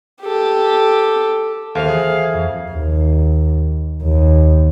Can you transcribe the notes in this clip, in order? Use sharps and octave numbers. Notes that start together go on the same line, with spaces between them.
G4 A4
D#2 A4 C5 E5 F5 F7
E3 G#4
G#6
F2
D#2
D#2